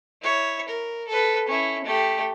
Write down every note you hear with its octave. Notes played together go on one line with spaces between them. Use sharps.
E4 C#5
A#4
A4 B4
C#4 E4
A3 G4